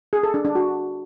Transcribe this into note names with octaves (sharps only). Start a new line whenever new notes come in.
G#4
A4
D4
D4
F#4